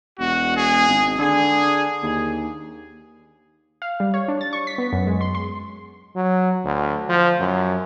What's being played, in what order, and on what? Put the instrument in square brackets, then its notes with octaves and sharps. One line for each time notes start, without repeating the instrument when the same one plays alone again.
[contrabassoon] E1 [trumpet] F#4
[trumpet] G#4
[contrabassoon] G#1
[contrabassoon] D3 [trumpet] G#4
[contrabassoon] D#2 [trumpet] G#4
[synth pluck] F5
G3
C#5
D4
A6
C#6
B6
B3
F#2
G#3
C6
C6
[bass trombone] F#3
D2
F3
F#2